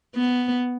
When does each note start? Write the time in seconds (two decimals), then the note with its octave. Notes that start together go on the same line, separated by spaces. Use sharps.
0.15 B3